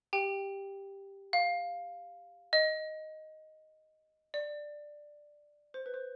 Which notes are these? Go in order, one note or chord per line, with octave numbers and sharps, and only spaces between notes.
G4 G5
F5
D#5
D5
C5
B4
C5